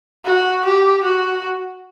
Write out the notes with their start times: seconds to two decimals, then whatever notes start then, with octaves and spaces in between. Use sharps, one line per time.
0.25 F#4
0.65 G4
1.03 F#4